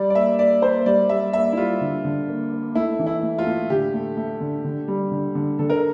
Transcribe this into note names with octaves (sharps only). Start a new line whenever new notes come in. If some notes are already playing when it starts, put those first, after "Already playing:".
Already playing: G3 D5
D5
A#3 E5
A#3 D5
A#3 C5
G3 D5
G3 E5
A#3 E5
E4
G3 F4
D3
D3
A#3
A#3
A3 E4
E3
E4
A3
F4
A2
D3 G4
A3
A3
D3
D3
G3
D3
D3
D3 A4
A#4